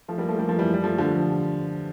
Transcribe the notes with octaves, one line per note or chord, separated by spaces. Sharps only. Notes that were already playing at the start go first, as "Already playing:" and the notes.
F3 A3
G3 A#3
F3 A3
G3 A#3
F3 A3
E3 G3
G3
F3 A3
D3 F3